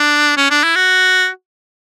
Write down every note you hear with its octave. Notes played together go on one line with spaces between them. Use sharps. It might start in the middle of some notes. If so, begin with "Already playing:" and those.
Already playing: D4
C#4
D4
E4
F#4